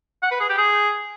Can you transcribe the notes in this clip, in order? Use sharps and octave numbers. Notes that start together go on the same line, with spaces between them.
F#5
B4
G#4
G4
G#4